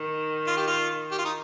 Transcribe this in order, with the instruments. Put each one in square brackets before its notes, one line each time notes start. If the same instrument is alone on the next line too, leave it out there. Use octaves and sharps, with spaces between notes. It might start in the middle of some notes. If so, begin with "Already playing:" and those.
Already playing: [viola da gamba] D#3
[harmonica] F4
G4
F4
G4
F4
D#4